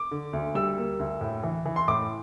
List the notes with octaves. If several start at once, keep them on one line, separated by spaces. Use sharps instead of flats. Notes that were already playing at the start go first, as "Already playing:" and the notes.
Already playing: D6
D3
D2
G3 E6
A#3
D2
A2
E3
E3
C6
A2 D6